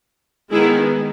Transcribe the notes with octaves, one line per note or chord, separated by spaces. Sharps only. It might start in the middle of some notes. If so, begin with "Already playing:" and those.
D#3 G#3 B3 E4 G#4